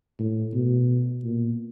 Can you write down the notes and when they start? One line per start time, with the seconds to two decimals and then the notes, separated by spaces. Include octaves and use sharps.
0.19 A2
0.54 B2
1.24 A#2